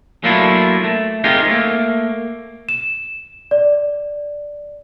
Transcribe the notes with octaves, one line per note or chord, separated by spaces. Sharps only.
F#3 A3 A#3 D4 E4 F4
A3
C4 D#4 F4 G4 G#4 A#4
A3 A#3
E7
D5